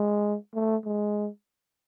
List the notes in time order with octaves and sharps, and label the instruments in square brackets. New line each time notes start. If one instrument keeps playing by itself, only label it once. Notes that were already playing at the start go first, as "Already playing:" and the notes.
Already playing: [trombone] G#3
A3
G#3